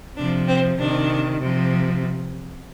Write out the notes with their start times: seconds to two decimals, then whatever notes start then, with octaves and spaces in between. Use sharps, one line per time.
0.17 C3 F3 D4
0.47 C4
0.78 C3 D#3 D4
1.40 C3 F3